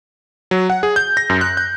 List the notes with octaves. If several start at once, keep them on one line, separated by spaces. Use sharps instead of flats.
F#3
F#5
G#4
G6
A#6
F#2
F#6
G6